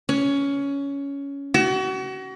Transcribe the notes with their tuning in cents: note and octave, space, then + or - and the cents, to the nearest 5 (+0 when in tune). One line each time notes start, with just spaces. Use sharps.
C#4 +15
F#4 +35